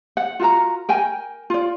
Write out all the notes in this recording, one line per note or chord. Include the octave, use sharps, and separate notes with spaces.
F#5
F4 F#4 A#4 A#5
A#4 G5 G#5
F4 D5